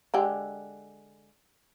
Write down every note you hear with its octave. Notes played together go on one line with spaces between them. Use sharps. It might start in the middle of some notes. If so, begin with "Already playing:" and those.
D3 G#3 G4